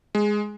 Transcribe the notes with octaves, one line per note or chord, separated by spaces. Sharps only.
G#3